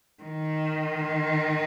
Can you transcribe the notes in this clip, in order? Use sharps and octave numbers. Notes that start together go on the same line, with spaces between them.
D#3